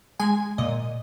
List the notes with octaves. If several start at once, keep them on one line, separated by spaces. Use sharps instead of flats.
G#3 G#5
A#2 D#5